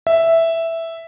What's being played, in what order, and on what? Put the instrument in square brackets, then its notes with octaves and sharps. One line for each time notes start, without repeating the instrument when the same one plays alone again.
[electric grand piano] E5